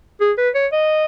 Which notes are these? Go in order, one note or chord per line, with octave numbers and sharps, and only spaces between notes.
G#4
B4
C#5
D#5